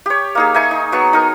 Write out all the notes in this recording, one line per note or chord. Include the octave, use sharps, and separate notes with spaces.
G4 C#5
A#3 D#4 G#4
D#4 E5 G#5 C#6
D#4
F#3 B3 C#6
D#4 A#4